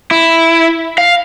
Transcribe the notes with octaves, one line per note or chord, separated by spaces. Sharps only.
E4
F5